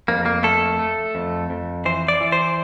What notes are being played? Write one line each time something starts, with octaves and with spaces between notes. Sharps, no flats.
F2 A#3
A#3
A3 A4
A3
F2
F2
E3 C5
D5
E3
C5